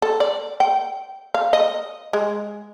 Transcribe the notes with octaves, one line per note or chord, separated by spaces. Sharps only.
A4
D5
G5
F5
D#5
G#3